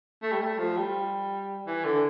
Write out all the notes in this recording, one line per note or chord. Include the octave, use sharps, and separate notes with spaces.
A3
G3
A3
F3
G3
E3
D3